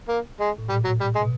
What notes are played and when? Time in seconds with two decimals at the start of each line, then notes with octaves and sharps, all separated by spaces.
0.09 A#3
0.40 G#3
0.58 A2
0.69 A#2 G3
0.84 F#3
1.01 G3
1.15 G#3
1.22 B2